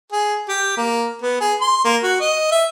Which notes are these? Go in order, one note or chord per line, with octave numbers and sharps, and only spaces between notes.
G#4
G4
A#3
B3
G#4
C6
A#3
F#4
D#5
E5